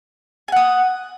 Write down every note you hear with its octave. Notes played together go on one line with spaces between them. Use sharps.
F#5 G#5 D#6